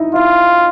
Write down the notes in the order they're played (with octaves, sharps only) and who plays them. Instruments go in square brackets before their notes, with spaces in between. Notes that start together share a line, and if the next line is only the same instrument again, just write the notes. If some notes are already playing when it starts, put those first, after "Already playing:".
Already playing: [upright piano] D#4 E4
[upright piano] E4 [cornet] F4